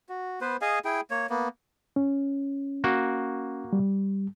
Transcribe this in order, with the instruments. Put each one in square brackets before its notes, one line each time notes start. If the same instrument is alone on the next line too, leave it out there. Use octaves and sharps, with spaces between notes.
[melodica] F#4
B3 B4 C5
G#4 D#5 F5 G#5
E4 G#4 G5
A#3 C#5
A#3 B3
[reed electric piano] C#4
[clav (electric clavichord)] A#3 F#4
[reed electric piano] G3